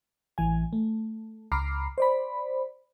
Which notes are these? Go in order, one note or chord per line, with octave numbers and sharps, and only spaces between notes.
A1 E3 G#5
A3
C#2 A#5 B5 D6 F6 C7
C5 D5 B5